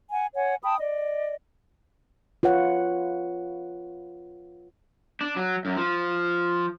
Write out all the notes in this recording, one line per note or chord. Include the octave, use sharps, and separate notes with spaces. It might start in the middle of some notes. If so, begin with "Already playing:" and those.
F#5 G#5
C#5 F#5 G#5
G5 A5 B5 D#6
D5 D#5
F4 B4 C#5 F#5
D4
F#3
F#2
F3